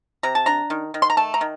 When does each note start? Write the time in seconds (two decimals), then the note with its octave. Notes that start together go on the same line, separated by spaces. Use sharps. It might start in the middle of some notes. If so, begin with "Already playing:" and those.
0.23 C3 A#5
0.35 A5
0.46 D4 A#5
0.70 D#3
0.94 D#3
1.02 C6
1.10 A#5
1.17 A3 A5
1.34 A#5
1.41 D#3